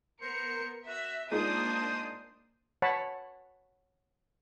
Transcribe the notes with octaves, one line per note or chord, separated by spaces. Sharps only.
B3 A#4 C5 C#7
F#4 E5
G#3 A#3 D4 D#4 F4 C5 D#6
C#5 F#5 A5 B5